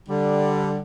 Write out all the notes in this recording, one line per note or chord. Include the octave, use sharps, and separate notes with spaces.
D3 G3